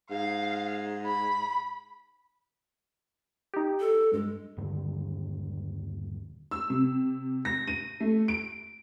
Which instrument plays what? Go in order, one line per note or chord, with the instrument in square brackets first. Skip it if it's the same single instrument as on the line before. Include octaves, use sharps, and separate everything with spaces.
[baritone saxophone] G#2 [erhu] F5
[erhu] B5
[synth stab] D#4 G4
[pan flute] A4
[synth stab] G2 [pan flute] G#3
[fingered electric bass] D#1 G2 D3 D#3
[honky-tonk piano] E6
C3
A#6
D#7
A3
D7